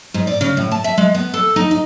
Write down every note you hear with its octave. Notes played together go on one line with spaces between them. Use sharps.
G#2
D5
C#3
A2
A5
E5
G#3
B3
A4
D#4
D#4